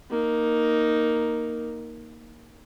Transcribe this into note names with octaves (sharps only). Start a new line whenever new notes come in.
A#3 D#4